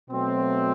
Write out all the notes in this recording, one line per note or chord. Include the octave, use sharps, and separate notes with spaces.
B2 F#3 A3 C4